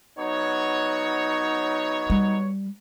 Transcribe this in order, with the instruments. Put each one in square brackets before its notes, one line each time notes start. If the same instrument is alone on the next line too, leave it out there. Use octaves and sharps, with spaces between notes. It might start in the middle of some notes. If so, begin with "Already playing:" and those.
[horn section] F#3 B3 C#5 [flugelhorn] D#4
[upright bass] G3